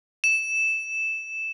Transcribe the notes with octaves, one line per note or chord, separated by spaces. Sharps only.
E7